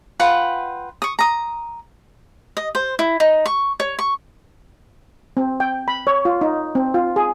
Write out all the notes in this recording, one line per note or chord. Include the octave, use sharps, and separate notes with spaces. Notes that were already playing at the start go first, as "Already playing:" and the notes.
F4 B4 F#5 G5
C#6 D#6
A#5 D#6
D#5
C5
E4
D#4
C#6
C#5
C#6
C4
G5
B5
C#5
F4
D#4
C4
F4
G#4